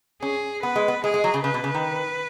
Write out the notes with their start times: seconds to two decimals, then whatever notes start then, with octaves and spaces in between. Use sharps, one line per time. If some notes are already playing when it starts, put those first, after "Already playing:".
0.22 C#4 G#4
0.63 B3 B4
0.76 G#3
0.88 B3
1.04 G#3 G#4
1.14 G#3
1.24 F#3
1.34 C#3
1.44 C#3 B4
1.54 B2
1.64 C#3
1.74 D#3